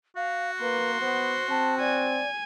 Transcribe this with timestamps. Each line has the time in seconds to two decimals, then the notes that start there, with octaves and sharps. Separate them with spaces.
0.16 F#4 F5
0.61 A#3 B4 C6
1.01 B3 C5
1.50 C4 A5
1.80 D5 G#5